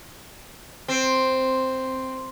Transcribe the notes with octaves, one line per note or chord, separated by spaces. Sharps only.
C4